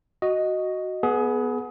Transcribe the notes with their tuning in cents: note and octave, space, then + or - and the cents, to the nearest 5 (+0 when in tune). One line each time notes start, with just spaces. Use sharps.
F#4 +0 D#5 +0
B3 -5 G#4 +25